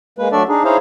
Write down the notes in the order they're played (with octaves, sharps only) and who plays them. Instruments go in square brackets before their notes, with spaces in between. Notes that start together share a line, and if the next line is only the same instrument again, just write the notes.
[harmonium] G#3 A#3 B4
F#3 A3 D4 A4 D5 E5
D4 D#4 G#4
D#4 E4 G#4 C5 C#5 F5